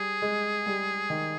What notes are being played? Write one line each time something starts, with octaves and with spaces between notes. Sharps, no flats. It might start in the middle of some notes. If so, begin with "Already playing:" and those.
Already playing: G3 G#4
G#3
G3
D#3